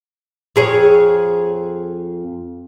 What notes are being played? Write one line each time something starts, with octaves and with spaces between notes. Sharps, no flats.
F2 G#4 C#5